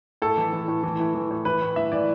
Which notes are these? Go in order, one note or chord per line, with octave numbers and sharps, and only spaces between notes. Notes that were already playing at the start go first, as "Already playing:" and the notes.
A2 A4
E3
E3
A2
E3
E3
E3
A2
E3 B4
A2
E3 E5
E3 D5